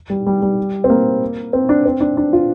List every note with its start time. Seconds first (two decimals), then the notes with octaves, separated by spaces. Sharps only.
0.10 G3
0.27 G3
0.42 G3
0.84 C4
0.90 A#3
1.53 C4
1.69 D4
1.86 C4
2.01 D4
2.17 D4
2.33 F4